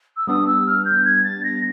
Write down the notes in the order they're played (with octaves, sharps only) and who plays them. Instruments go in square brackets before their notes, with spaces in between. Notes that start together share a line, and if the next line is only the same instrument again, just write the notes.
[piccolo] E6
[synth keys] G3 B3 D4 [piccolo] D#6
[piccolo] E6
F6
G6
G#6
A6
A#6